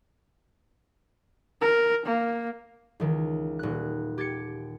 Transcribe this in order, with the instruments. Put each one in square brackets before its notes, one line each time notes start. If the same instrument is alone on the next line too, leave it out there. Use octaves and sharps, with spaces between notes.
[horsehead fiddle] A#4
A#3
[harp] C#2 D#3 E3
D#1 F#6
G4 G#6 A6 C#7